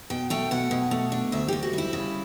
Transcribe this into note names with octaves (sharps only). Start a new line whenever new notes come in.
B2 G5
A3 G5
B2 F#5
B2
A3
D4
D2 E5
D2 G4
F#4
G3 E4
C#3